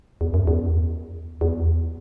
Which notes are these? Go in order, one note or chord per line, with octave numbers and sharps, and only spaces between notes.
E2
F#2
E2
E2